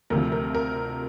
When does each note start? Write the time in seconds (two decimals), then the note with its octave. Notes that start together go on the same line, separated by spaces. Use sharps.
0.10 D2 C3 F3 A#4
0.32 A#4
0.55 A#4